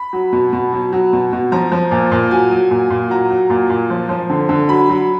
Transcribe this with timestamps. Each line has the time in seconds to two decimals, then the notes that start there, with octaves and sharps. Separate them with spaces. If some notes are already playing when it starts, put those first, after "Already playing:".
Already playing: B5
0.13 F#3
0.33 B2
0.53 B2
0.73 F#3
0.93 F#3
1.13 B2
1.33 B2
1.52 F3 A#5
1.72 F3
1.91 A#2
2.12 A#2
2.31 F#3 G#5
2.52 F#3
2.71 A#2
2.90 A#2
3.10 F#3 A#5
3.31 F#3
3.50 A#2
3.70 A#2
3.90 F3
4.09 F3
4.30 D3
4.49 D3
4.69 F#3 B5
4.90 F#3